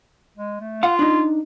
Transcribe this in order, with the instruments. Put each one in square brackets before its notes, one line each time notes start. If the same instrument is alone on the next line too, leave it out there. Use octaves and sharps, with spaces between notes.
[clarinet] G#3
A3
[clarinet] F4 [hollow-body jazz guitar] F5 F#5
[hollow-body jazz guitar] D4 D#4